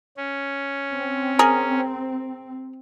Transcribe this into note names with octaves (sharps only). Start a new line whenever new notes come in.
C#4
C4
G#4 A#4